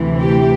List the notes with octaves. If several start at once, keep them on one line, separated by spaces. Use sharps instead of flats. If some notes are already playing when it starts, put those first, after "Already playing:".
Already playing: D2 C3 E3
G4